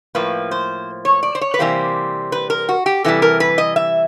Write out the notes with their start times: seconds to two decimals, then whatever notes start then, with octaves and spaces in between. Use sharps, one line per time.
0.15 A2 F3 A#3 B4
0.51 C5
1.05 C#5
1.23 D5
1.35 C5
1.41 C#5
1.54 B4
1.59 C3 E3 G3 A#3 C5
2.32 B4
2.50 A#4
2.69 F#4
2.86 G4
3.04 C3 E3 G3 A4
3.22 A#4
3.40 B4
3.58 D#5
3.76 E5